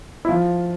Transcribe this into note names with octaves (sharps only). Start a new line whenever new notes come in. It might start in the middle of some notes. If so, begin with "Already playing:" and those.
E4
F3 F4